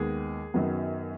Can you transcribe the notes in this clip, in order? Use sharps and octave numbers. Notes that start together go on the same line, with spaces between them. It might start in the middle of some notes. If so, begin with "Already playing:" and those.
Already playing: D#2 D#3 G#3 B3 G#4
F#2 D#3 F#3 B3